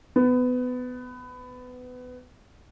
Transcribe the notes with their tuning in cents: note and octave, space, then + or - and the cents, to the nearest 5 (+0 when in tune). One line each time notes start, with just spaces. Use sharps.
B3 +20